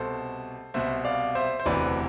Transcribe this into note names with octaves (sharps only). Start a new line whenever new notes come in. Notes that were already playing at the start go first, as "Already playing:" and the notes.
Already playing: C2 B2 A4 C5
C2 B2 C5 E5
D5 F5
C5 E5
C5
E1 D2 C3 E3 B4 D5